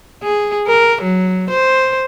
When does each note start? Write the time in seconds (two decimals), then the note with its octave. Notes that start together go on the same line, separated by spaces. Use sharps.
0.23 G#4
0.67 A#4
1.02 F#3
1.50 C5